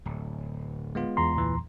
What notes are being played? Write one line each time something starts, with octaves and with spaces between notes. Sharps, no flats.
D1
G#3 B3 F4
E2 A#5 C6
C#2 A#2 E3